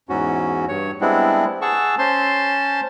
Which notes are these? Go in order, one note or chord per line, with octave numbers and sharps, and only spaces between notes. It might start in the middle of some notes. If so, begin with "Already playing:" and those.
E2 G#2 C#4 F#4
G2 C#5
G3 G#3 B3 C4 D4 E4
G#4 F#5 A5 C#6 E6
C#4 C5 A5 C6